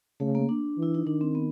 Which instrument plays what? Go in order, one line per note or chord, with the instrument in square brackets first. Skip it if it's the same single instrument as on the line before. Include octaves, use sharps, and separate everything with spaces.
[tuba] C#3 [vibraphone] A3
[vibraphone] A#3
D4
[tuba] E3
[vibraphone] E4
D#4
[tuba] D#3 [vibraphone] D4
[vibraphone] C4
B3